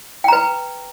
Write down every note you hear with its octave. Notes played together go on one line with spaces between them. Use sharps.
B4 G5 A#5